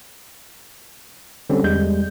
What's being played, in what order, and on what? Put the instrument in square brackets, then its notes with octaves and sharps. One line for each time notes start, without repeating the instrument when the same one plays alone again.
[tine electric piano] D3 G3 C4 C#4
E2 G3 G#3 G6